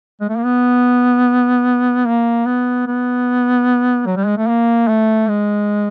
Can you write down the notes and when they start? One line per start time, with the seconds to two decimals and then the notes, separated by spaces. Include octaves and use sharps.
0.21 G#3
0.29 A3
0.37 A#3
0.45 B3
2.06 A#3
2.46 B3
2.87 B3
4.06 F#3
4.16 G3
4.26 G#3
4.37 A3
4.47 A#3
4.88 A3
5.28 G#3